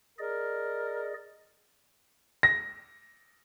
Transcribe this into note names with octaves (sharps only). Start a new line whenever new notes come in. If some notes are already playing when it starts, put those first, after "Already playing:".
G#4 A#4 D5 D#5
A#6